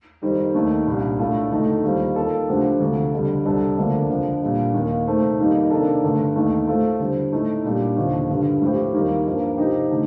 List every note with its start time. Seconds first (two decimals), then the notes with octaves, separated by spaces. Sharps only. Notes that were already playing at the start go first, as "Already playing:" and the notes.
0.22 F2 D#3 G3 C4
0.54 D#2 D#3 A3
0.87 C2 A#2 G3 D4
1.19 A2 A3 D4 F4 A4
1.51 D2 D3 A3 D#4 A4
1.83 D#2 D#3 G3 C4 F4
2.16 D#3 A#3 F4 A4
2.48 D2 D3 F3 C4 G4
2.80 D2 C3 F3
3.12 F2 D3 G3
3.45 C2 C3 G3 D4 A4
3.78 D2 D3 F3 A#3 D4
4.10 F2 D3 F3
4.42 A#2 G3 D4
4.74 D#2 D#3 A#3
5.06 C3 D#3 A3 C4
5.38 F2 D#3 G3 A#3 D#4
5.71 C3 D#3 A#3 D4 A4
6.03 G2 D3 A3
6.35 D#2 D#3 A3
6.67 A2 A3 C4 F4 A4
6.99 D3 G3 C4
7.32 A2 A3 D#4 A4
7.64 A#2 G3 D4 G4
7.97 D#2 D3 F3
8.29 G2 D3 G3
8.61 A2 F3 C4 G4
8.94 D#2 D#3 G3 A#3
9.26 G2 F3 A#3
9.58 C3 F3 C4 D#4 G4
9.91 D3 A3 D#4